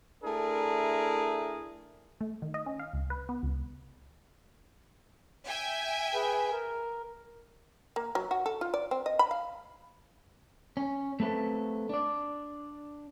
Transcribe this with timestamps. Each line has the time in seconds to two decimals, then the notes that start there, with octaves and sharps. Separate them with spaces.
0.23 A3 D4 E4 G#4 A#4
2.21 A3
2.42 D#3
2.54 D#5
2.66 C#4
2.79 F5
2.93 C#2
3.10 B4
3.29 B3
3.43 C#2
5.47 E5 G5 G#5
6.15 G#4 B4
6.52 A#4
7.96 A#3
8.15 F#3
8.31 F#4
8.46 A4
8.61 F4
8.74 D5
8.91 C4
9.06 D#5
9.19 B5
9.31 F5
10.77 C#4
11.20 A3 C4 A4 B4
11.89 D4 D5